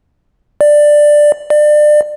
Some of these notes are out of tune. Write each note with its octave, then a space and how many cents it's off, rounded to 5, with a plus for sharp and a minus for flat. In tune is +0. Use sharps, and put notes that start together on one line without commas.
D5 +10
D5 +30